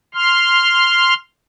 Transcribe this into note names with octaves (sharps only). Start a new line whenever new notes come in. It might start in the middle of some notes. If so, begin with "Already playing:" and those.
C6 F6